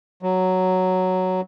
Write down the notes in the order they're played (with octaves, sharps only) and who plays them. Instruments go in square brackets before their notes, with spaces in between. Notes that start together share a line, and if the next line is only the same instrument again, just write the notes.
[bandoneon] F#3